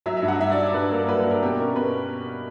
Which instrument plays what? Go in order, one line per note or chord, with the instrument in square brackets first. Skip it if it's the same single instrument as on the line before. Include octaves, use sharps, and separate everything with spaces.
[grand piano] F#3 E5
E5
G2
F#5
G2 E5
D5
D4
G2 B4
A#3 A#4
F#3 B4
B4
D4 A#4
B2 G4
C#4 A#4
B2 B4